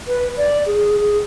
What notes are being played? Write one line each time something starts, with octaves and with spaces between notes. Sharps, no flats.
B4
D5
G#4
G#4